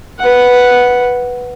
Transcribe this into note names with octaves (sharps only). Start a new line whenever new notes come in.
B4 F#5